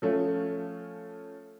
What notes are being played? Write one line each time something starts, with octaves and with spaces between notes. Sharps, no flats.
F3 A3 C#4 F4